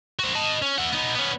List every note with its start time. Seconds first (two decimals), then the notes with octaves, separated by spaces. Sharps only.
0.19 F#4 C5
0.35 D#5 A5
0.62 C#4
0.78 E4 F#5
0.93 B3 D#4
1.15 B3 C#4